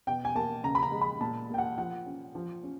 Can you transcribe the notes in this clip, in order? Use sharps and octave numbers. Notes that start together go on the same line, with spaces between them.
B2 G5
G#5
A#3 A5
C#3 A#5
B5
A#5
G#3
B5
A#2 A5
A#3 G5
F#5
F3 F#5
C#4
F3
C#4